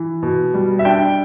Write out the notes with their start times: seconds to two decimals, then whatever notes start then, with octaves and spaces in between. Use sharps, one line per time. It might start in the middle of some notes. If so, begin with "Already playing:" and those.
Already playing: E3
0.23 B2
0.54 G3
0.79 E5
0.85 D4 G5